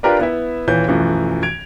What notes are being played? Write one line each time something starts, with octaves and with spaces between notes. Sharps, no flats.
D4 F4 G4 A#4 B4 D5
B3 E4 E5
D#1 A#2 E3 C#5 G6
B1 F#2 E3 F3 A3
G#6 D7 F7